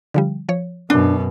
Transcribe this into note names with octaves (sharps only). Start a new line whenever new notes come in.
D3 F3 G3
F3 C#5
F#2 B2 D4